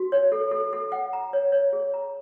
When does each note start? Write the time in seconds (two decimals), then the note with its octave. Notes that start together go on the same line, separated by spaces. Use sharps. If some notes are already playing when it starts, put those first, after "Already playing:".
Already playing: F#4
0.12 C#5
0.32 A4
0.51 A4
0.73 A4
0.92 F#5
1.13 A#5
1.33 C#5
1.52 C#5
1.73 G#4
1.94 A#5